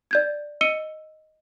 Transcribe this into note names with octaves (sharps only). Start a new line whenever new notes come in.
D5 G6 G#6
D#5 E6 C#7 D#7 G7